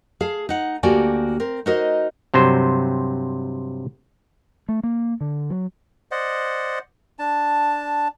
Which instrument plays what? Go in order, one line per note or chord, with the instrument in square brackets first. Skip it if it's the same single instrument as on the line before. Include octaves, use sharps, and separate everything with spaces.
[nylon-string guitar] G#4 F5 A5
D#4 F#5
D2 A#3 F#4 G4 D5 G#5
C4 A#4
D#4 F#4 A#4 C5 D#5
[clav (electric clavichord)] G2 C3 F#3 C5
[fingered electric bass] A3
A#3
D3
F#3
[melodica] C5 D5 D#5 F#5
D4 A5